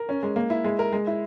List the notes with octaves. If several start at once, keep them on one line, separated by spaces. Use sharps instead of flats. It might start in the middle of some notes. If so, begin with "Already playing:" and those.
Already playing: A#4
C#4
G#3
A#3
E4
G#3
A#4
G#3
E4